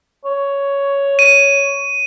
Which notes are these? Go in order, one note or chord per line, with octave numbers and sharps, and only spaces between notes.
C#5
D#7